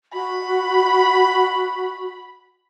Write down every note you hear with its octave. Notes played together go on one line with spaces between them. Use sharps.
F#4 B5